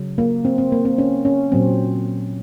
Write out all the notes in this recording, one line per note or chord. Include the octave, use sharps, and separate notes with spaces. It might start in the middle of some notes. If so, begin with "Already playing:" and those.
Already playing: C#3 F#3
A#3
C4
C4
A#3
C4
C#4
C#4
A#2 F#3 A#3 C4